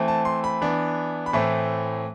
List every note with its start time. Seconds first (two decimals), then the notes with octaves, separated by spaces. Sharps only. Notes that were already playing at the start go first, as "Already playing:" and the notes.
Already playing: E3 A3 C4
0.08 A5
0.25 C6
0.44 B5
0.62 E3 B3 D4
1.26 B5
1.33 A2 E3 A3 C4 A5